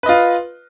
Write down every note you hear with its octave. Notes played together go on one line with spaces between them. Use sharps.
F4 B4 D#5